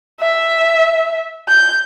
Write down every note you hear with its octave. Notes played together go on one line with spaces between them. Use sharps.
E5
G6